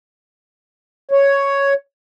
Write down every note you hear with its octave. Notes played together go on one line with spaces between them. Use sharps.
C#5